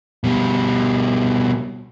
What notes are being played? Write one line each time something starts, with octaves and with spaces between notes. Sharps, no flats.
B2 G3